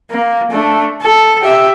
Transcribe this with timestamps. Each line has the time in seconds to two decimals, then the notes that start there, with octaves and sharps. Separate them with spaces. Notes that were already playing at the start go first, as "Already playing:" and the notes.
0.11 A#3
0.51 A3 D4
1.02 A4
1.42 G4 E5